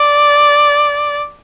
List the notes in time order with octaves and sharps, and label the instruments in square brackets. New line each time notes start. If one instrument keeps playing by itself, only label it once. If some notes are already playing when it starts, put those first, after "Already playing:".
Already playing: [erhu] D5